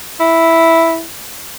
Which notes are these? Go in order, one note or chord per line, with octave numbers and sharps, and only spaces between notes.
E4